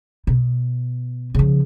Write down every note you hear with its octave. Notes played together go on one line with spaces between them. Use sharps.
B2
C#3 F3